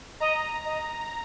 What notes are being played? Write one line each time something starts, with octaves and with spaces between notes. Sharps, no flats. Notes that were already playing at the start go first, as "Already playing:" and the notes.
D#5 A#5
D#5